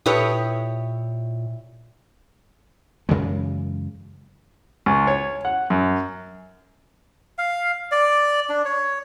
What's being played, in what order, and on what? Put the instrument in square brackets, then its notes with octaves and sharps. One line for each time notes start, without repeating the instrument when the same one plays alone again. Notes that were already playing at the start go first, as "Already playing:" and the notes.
[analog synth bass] A#2 [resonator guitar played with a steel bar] E4 G4 C#5 [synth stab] A4 B4 D#6
[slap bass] F#2 C#3 E3 G#3
[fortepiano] C#2
C#5
F#5
F#2
[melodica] F5
D5
D4
C#5